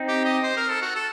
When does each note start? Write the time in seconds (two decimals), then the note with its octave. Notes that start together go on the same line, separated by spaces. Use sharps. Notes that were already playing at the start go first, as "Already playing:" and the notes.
Already playing: C4 D#4
0.08 G4
0.25 D#5
0.43 C5
0.57 A#4
0.69 A4
0.82 F#4
0.96 A4